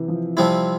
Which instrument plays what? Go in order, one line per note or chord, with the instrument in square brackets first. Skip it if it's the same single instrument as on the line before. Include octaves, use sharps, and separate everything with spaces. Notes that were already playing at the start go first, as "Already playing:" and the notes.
Already playing: [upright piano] C3 E3
F3
[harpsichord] C3 F3 C4 E4 [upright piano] G3